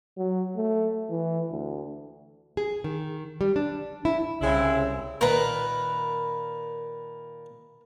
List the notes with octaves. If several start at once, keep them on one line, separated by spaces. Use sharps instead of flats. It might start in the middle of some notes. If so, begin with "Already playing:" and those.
F#3
A3
E3
D2
G#4
D#3
G3
D4
E4
C2 C#3 G#3 C4 E4
A#2 D#3 A#4 B4